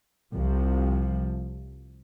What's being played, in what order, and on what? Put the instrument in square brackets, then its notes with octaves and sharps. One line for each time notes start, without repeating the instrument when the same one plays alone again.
[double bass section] C2 C3 F3